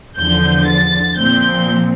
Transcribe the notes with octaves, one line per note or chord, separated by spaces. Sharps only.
E2 D3 F3 G6
A6
A#2 F3 C4 G6